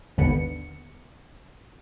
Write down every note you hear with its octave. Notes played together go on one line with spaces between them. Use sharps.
G#1 D#2 D3 B3 C#7